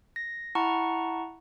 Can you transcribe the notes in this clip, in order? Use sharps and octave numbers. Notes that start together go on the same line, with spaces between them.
A#6
E4 F#5 A5 A#5 C#6